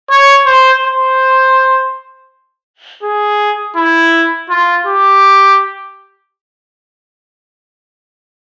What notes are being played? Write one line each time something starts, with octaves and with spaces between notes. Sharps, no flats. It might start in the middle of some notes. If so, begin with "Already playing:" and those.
C#5
C5
C5
G#4
E4
F4
G4